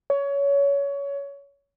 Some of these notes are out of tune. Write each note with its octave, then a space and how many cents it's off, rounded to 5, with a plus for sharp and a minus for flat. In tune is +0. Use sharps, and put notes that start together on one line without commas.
C#5 +20